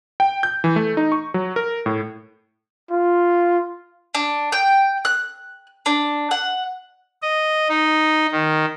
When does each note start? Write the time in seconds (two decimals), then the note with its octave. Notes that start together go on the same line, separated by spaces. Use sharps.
0.20 G5
0.43 G6
0.64 E3
0.76 A3
0.97 D#4
1.12 C#6
1.34 F#3
1.56 A#4
1.86 A2
2.91 F4
4.15 D4
4.52 G5
5.05 F#6
5.86 D4
6.31 F#5
7.22 D#5
7.68 D#4
8.31 D#3